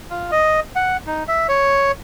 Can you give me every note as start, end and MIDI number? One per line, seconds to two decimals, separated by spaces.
0.10 0.31 65
0.32 0.60 75
0.76 0.97 78
1.07 1.23 63
1.28 1.47 76
1.49 1.92 73